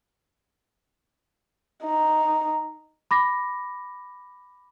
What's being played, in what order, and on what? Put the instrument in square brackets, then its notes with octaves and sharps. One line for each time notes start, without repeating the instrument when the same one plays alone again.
[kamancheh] D#4
[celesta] B5 D6 A#6